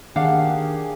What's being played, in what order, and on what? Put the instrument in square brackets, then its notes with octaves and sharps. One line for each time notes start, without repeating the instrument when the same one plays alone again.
[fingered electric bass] D#3 [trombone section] A#3 G4 G#4 [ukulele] D4 F5 F#5